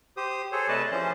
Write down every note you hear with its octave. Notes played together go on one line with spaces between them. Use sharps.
G4 C5 D#6
G#4 A4 C5 C#5
C3 A3 B4 D5 D#5 A5
E3 F3 C#4 C5